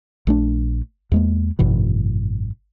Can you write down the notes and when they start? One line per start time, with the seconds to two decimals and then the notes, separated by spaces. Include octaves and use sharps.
0.27 A#1 A3 D4
1.12 E2 G#3 A#3
1.59 G#1 F#2 B2 E3